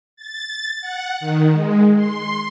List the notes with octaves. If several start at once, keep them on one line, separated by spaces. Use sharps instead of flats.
A6
F#5
D#3
G#3
C6